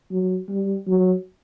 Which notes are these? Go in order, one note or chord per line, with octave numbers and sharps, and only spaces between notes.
F#3
G3
F#3